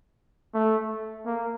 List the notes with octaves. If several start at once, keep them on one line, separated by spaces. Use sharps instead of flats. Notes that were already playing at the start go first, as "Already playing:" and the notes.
A3
A#3